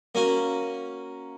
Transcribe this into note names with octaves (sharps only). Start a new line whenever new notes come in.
A#3 C#4 F#4